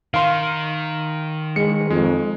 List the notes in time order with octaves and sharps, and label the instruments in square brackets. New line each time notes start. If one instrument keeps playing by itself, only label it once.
[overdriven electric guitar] D#3 [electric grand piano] F5 C6
[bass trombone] G#3 [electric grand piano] C#7
[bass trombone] F2 [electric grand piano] G#3